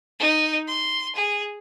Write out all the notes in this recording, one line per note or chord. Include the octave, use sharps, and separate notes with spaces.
D#4
C6
G#4